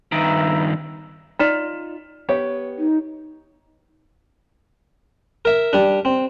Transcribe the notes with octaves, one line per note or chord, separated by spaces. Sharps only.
G2 D#3 B4 E5 A#5
D#4 F4 D5 F6 B6 E7
B3 G4 C#5
D#4
A#4 E5
G3 D4
C4